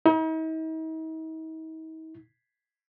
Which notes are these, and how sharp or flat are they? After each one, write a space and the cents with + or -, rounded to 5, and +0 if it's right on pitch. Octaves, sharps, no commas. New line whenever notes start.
D#4 +45